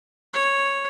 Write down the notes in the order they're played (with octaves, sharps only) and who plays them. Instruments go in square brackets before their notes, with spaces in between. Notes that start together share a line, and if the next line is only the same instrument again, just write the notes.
[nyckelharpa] C#5